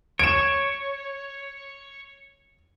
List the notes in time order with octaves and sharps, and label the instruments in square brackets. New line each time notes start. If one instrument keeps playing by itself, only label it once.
[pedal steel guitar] C#5 [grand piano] D7 E7